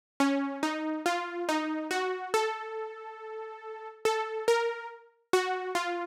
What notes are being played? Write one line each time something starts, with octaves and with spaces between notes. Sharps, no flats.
C#4
D#4
F4
D#4
F#4
A4
A4
A#4
F#4
F4